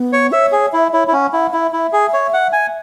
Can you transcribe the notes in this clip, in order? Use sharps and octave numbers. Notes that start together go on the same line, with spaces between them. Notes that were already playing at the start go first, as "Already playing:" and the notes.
Already playing: B3
C#5
C#5 E5
G#4
E4 E5
E5
E4 C#5
E4
C#4 F#5
E4 F#5
E4 E5
E4
G#4
C#5
F#5
G#5